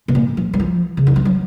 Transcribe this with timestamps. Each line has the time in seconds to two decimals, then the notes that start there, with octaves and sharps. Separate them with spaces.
0.08 B2
0.15 A#2
0.37 F3
0.54 F#3
0.59 F3
0.97 C#3
1.07 D#3
1.16 F3
1.25 F#3